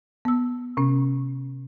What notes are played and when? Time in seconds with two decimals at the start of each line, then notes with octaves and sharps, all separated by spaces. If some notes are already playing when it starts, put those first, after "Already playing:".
0.25 B3 E6
0.77 C3 C#4